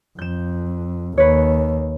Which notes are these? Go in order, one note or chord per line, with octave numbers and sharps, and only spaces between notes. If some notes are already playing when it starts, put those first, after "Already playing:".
F2 G6 E7
D#2 B4 C#5